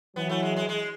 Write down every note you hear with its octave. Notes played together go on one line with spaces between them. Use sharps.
E3 F#3 B3
A3
G#3
G#3
G#3